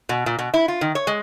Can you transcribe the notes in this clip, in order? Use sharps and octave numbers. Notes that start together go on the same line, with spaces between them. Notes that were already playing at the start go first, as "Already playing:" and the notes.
B2
A#2
B2
E4
F4
D#3
C#5
G#3